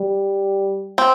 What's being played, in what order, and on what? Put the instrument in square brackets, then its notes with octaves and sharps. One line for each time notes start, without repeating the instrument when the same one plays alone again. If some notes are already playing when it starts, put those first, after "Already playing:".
Already playing: [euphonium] G3
[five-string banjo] C4